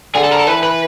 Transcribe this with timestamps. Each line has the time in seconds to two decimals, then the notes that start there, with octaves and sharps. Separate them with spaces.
0.14 D3 G#4
0.23 A4
0.31 A#4
0.39 A4
0.47 E3 B4
0.63 B4